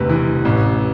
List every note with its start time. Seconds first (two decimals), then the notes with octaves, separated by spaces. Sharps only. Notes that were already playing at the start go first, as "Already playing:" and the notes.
Already playing: E1 D2 C3 B4
0.09 E3
0.45 A1